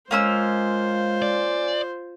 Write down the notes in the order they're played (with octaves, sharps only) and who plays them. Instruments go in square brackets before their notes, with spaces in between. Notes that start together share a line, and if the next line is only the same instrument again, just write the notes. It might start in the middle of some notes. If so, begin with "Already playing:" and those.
[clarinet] G#3 [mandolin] A#3 C#4 E6 [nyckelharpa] F4 C5
[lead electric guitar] D5